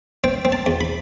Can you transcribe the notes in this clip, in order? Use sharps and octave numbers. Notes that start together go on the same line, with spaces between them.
C4 G5
C4
A5
E2
B5